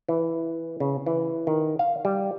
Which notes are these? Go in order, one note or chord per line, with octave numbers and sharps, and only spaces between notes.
E3
C#3
E3
D#3
F5
G3